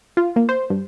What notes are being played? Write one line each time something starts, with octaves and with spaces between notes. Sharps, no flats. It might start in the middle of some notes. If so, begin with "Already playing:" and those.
F4
A#3
C5
G2